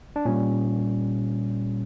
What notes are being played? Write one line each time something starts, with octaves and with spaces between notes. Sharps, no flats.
D4
A#2 G3 C#4